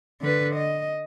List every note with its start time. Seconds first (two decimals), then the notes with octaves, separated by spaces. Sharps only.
0.21 D3 B4
0.56 D#5